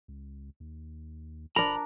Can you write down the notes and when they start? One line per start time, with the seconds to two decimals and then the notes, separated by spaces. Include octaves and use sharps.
0.08 C#2
0.60 D#2
1.56 E1 D4 A#4 A#5 B5